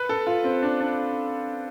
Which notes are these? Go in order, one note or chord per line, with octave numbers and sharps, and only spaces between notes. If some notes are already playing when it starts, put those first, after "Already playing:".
Already playing: B4
A4
F4
C4
D4
D4